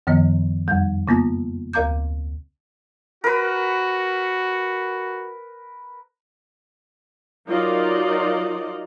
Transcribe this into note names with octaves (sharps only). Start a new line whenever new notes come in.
F#2 D#3 F3 B3 D#5
F2 G3
C#3 A#3 B3 F4
D2 A#4 F5 A#5 D6 G6
F#4 A#4 B4
F#3 D#4 F4 A#4 D5 D#5